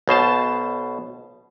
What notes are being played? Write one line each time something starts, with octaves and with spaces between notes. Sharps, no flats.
B1 B2 C5 A5